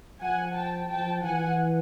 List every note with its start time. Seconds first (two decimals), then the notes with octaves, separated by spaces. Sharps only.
0.21 F3 F#5 G#5
0.55 G5 A5
0.89 F3 G5 A5
1.23 E3 F#5 G#5